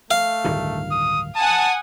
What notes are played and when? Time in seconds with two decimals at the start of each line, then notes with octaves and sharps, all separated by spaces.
0.11 A3 F5
0.44 D1 G2 D#3
0.91 D#6
1.36 F#5 G#5 A5 D#6